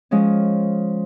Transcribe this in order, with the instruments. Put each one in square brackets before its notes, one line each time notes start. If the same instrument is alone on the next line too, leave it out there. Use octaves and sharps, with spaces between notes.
[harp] F3 G#3 C#4